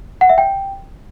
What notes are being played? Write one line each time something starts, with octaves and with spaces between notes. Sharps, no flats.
F#5
E5
G5